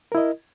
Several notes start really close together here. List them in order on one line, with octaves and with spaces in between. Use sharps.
A#4 E4 D#5